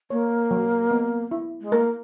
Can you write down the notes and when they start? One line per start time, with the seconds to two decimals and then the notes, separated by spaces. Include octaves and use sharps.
0.10 A#3 C#5
0.51 F#3
0.91 B3
1.31 E4
1.61 G#3
1.72 A#3 A#4